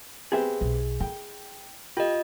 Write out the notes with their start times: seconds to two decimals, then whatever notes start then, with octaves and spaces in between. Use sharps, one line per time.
0.32 B3 C4 G4 G#4 E5
0.61 B1
1.00 E4 G5
1.97 F4 G4 D#5